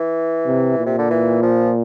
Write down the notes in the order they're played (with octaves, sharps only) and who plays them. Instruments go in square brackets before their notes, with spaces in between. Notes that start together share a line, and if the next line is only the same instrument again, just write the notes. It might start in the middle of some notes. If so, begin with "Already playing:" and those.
Already playing: [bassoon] E3
[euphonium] C3
A#2
[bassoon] C3
D3
E3
F3